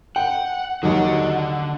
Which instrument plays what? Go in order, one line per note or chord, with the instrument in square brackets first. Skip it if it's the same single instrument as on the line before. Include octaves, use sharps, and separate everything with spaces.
[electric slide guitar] F#5 [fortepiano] G5
[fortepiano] D#2 D#3 F#3 [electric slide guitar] D3 F#5